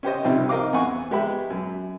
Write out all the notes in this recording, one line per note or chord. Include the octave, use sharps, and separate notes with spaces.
C#4 G4 C5 D#5
C2 C3 D#3 F3 G3 C4
D#4 A#4 D#5 F5 D6
E2 C4 F#5 G#5 C#6
G#3 B3 G4 E5 B5
F#2